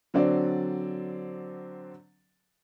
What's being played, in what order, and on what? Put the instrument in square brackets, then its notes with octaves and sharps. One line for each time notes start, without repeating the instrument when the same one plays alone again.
[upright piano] D3 F#3 C4 D5